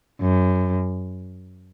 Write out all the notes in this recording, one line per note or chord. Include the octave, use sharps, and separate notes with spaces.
F#2